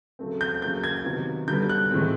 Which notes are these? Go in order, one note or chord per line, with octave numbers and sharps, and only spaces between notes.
C#3 F#3 A3 C4
G6
C#3 F#3 A#3 G6
G#6
C3 D#3 F#3 B3
D3 G3 B3 G6
F#6
A2 E3 G#3 C4